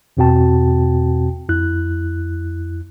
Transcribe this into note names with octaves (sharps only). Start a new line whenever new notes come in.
E2 B2 C4 F#4 G5 A5
F2 E4 F#6